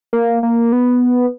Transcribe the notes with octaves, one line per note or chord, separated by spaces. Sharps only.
A#3
A#3
B3